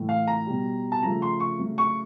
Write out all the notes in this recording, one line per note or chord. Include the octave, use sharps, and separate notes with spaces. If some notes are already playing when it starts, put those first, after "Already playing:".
Already playing: A2 E3 A3
F5
A#5
B2 G3
A5
C#3 F3 A3 A#5
C6
C#6
C#3 F#3 A3
C#6